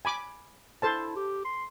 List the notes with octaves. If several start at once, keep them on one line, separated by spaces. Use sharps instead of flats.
G#5 B5 D6
E4 A4 C5 A5
G4
C6